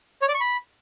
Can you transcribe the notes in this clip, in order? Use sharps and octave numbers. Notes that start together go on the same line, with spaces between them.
C#5
D5
C#6
B5